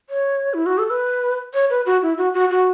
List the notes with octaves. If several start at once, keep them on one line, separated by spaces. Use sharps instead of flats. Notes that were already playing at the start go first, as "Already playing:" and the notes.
C#5
E4
F#4
A4
B4
C#5
B4
F#4
E4
F#4
F#4
F#4